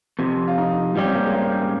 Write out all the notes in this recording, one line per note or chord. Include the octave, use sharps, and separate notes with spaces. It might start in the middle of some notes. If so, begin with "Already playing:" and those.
F2 C3
F4
D#4
G#2 G3 C#4 G4
C4
A#3
G#3
A#3